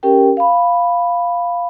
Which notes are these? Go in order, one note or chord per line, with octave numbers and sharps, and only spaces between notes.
C#4 G4 A#4 G5
F5 B5